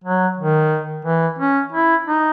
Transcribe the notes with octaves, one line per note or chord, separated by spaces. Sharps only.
F#3
D#3
E3
C#4
E4
D#4